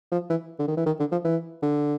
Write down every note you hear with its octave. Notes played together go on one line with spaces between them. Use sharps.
F3
E3
D3
D#3
E3
D#3
D3
F3
E3
D3